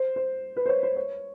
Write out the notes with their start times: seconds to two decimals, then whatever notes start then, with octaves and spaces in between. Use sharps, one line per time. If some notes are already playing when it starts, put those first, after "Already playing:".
Already playing: C5
0.16 C5
0.56 B4
0.66 C5
0.69 C#5
0.83 C5
0.96 C#5